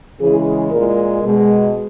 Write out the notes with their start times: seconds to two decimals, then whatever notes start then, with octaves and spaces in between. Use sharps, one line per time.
0.20 C#3 E3 G#3 G#4
0.71 A#2 G#3 A#4
1.22 B2 G#3